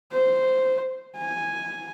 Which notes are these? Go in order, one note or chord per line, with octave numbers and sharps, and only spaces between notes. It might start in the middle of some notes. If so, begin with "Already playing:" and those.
C5
G#5